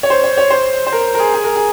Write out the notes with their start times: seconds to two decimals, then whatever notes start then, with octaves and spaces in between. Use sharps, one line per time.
0.03 C#5
0.10 C5
0.24 C#5
0.37 C#5
0.50 C5
0.87 C5
0.93 A#4
1.15 A#4
1.19 G#4
1.34 G#4
1.44 A#4
1.56 G#4